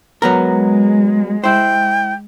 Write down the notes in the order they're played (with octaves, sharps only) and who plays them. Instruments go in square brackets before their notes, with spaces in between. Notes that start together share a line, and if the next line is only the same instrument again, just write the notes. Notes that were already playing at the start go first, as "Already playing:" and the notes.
[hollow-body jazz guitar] F#3 B3 A#4 [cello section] G#3
[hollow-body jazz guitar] E4 C5 [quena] G5